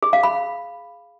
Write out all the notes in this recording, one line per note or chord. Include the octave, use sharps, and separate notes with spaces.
G#4
F5
B5